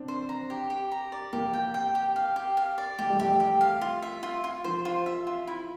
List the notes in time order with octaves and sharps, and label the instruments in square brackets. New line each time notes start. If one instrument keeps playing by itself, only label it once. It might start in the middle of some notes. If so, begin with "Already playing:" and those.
Already playing: [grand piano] C4 D4
[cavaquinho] C5
A#5
G4
G4
A#5
D5
[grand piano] A#3 [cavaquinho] G4
[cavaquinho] G5
G5
G4
F5
G4
F5
D5
[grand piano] A3 [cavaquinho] G4
[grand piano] G3
[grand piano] A3 [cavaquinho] G4
[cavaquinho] G4
F5
F4
E5
F4
F4
[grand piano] F3 [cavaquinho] C5
[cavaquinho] F4
E5
F4
E4